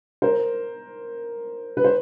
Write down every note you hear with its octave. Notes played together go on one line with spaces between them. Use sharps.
A#4 C5
B4
C5